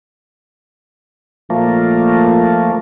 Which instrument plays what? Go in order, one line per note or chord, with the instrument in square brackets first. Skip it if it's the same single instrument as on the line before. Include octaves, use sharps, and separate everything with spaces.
[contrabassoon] A#2 [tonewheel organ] F3 A3 A#3